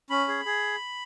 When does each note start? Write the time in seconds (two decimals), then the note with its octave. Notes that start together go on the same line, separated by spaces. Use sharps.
0.10 C#4 B5
0.28 G#4
0.45 G#4